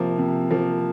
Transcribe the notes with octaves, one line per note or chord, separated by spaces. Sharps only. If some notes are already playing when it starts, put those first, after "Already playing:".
Already playing: C3 F3 A#3
C3
F3 A#3